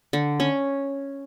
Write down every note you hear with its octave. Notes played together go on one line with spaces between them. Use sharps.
D3
C#4